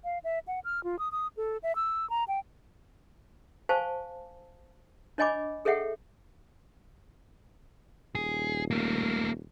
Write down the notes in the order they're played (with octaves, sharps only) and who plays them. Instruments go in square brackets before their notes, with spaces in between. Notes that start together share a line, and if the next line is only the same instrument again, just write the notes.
[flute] F5
E5
F#5
F6
F4
D#6
D#6
A4
E5
E6
A#5
G5
[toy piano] C5 F5 G#5 A5 C#6
D4 C#5 D#5 G#5 B5 D6
G#4 A4 C#5 E5 F#5 G5
[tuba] D#1 [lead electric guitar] G#4
[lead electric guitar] A3 A#3